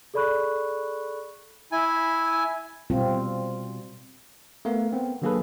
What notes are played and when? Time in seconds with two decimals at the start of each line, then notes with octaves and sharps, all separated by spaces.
0.14 G#4 A4 D5 B5 C#6 F#6
1.72 E4 G#5
2.90 B2 G3 C4 F4
4.65 A3 B3 A#4 F5
4.93 B3 C4
5.22 D3 F#3 A#3 G#4 A4 B4